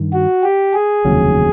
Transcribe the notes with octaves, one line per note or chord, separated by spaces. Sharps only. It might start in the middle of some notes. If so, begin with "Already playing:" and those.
Already playing: G2 D#3
F#4
G4
G#4
F1 D#2 C#3 F#3